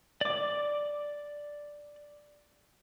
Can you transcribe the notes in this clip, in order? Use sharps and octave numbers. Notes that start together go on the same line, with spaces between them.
D5 D6